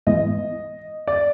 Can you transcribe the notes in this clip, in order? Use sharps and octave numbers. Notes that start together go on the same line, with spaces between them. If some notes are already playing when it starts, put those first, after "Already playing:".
G#2 E3 G#3 B3 D#5
D5